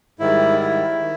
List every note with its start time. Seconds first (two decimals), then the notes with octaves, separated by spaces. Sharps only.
0.19 G#2 D#3 G3 E4
0.60 E4
1.00 D#3